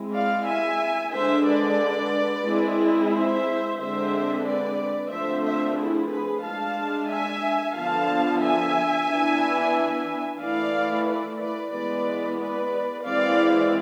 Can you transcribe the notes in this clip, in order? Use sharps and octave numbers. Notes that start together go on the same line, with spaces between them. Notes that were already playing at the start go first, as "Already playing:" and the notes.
Already playing: G#3 C4 E4
D5 F5
E5 G#5
D3 G#3 D4 C5 E5
B4 D5
G#3 C4 E4
C5 E5
D3 G#3 C4 C5 E5
B4 D5
D3 F3 A3 C4 C5 E5
C5 E5
E4 G#4
G#4 B4
G#3 D4 F5 A5
E5 G#5
D3 F3 B3 F5 A5
E5 G#5
E3 B3 D4
E3 A3 E4 D5 F5
B4 D5
B4 D5
E3 G#3 B3 B4 D5
B4 D5
E3 G#3 C4 E4 D5 F5